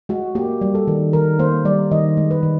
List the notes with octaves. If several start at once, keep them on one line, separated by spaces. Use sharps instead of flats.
G#3 F#4
A#3 G4
G3
A4
D#3
D#3 A#4
A#3 C5
G3 D5
D#3 D#5
G#3
B4
D#3